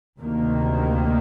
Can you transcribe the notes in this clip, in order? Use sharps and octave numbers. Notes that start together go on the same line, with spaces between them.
D2 C3 D#3 A#3